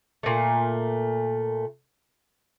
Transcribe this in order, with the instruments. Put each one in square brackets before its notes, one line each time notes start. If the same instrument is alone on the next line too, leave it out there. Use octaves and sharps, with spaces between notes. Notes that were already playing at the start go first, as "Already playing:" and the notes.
[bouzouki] A#2 A3